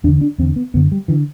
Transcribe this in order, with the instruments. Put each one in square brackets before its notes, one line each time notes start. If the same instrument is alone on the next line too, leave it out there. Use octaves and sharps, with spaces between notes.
[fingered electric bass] E2 D4
D3
D4
E2 D3 C4
B3
F#2 D3 B3
G3
D3 E3